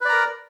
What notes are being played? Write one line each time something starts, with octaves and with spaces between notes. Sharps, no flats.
A#4 B4 D5 A#5